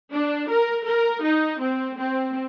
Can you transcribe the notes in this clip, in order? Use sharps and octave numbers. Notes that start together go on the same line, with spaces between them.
D4
A#4
A#4
D#4
C4
C4